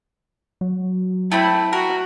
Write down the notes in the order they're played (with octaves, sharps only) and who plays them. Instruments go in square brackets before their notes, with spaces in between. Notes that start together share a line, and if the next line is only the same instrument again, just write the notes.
[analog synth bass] F#3
[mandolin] A3 C4 B5 [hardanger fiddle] E4
[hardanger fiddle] F#4 [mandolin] A#4